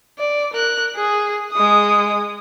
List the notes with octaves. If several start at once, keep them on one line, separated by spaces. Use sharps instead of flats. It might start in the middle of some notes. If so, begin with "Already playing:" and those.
D5
A#4 F#6
G#4
G#3 D#6